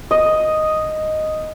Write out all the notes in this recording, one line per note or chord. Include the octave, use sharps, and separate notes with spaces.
D#5